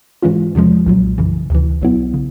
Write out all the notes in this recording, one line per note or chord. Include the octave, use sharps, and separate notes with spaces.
G#2 E3 G#3 C#4 F4
E2 C3 F3 G#3 C#4
B1 A#2 F#3
F#2 C#3 E3
D2 C3 E3
B1 B2 F#3 B3 E4
C#3